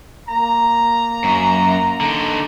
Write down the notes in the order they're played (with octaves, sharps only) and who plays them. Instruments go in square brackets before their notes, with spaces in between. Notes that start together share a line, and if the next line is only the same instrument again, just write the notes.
[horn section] A#3 A#5
[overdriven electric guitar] F#2
D3 D#4